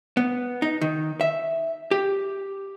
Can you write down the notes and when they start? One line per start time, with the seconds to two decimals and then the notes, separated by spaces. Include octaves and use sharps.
0.17 B3
0.62 D#4
0.81 D#3
1.21 E5
1.91 G4